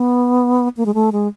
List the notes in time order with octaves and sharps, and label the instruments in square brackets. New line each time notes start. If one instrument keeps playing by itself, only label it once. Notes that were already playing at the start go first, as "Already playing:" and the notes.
Already playing: [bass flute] B3
A#3
G#3
A3
G#3